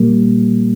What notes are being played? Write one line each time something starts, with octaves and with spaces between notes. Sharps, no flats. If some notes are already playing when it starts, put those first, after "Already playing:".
Already playing: A#2 G3 A#3